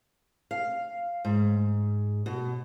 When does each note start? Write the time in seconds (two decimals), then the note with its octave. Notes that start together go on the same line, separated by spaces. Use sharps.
0.51 F5
1.25 G#2
2.26 B2